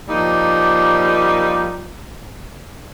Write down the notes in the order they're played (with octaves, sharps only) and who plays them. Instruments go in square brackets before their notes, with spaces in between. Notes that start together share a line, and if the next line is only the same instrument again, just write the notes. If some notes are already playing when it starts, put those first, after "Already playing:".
[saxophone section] F3 G3 A#3 D#4